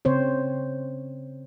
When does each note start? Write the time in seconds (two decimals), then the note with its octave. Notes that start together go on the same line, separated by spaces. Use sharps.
0.05 C#3 C4 C5 C#5